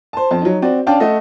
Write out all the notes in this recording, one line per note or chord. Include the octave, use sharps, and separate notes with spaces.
C5 A5
F2 A5
F#3 D#4
C4 F#4 D5
C#4 D4 D5 F5 G5 A5
A3 A4 D#5 E5 F#5